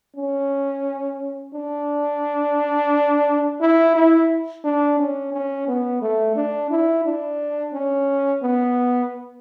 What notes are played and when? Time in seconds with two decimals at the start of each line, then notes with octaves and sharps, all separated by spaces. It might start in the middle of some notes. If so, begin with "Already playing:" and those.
0.16 C#4
1.54 D4
3.61 E4
3.96 E4
4.65 D4
4.99 C#4
5.33 C#4
5.68 B3
6.02 A3
6.36 D4
6.71 E4
7.05 D4
7.74 C#4
8.43 B3